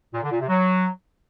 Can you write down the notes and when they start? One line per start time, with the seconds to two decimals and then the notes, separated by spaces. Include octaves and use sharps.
0.14 A#2
0.23 D3
0.31 A#2
0.40 C3
0.49 F#3